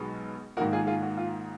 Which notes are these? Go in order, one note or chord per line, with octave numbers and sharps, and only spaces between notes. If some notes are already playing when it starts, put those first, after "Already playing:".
Already playing: B1 B2 G#3 B3 D#4
G#2 D#3 A#3 D#4 F#4 A#4
F4 G#4
F4 G#4
F#4
F4